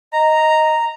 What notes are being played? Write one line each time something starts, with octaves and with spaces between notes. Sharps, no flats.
D#5 A#5